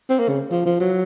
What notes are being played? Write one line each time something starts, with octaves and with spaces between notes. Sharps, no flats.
C4
A#3
C#3
F3
F3
F#3